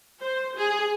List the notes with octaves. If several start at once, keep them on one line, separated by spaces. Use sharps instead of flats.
C5
G#4